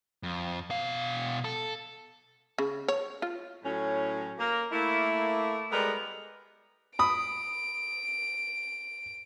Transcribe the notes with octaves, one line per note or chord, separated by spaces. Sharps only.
F2
B2 F5
A4
C#3
C#5
F4
A2 F#3 C#4
A#3 A#4
A3 A#3 E4
G3 G#3 B3 G4 A4 A#4
B5 D#6 D7